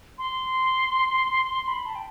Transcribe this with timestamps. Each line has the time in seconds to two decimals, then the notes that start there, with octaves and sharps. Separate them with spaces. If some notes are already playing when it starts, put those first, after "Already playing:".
0.18 C6
1.67 B5
1.86 A5
1.95 G5